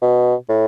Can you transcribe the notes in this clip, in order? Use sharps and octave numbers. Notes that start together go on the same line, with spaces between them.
B2
A2